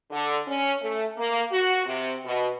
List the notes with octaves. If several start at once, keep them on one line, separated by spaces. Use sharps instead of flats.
D3
C#4
A3
A#3
F#4
C3
B2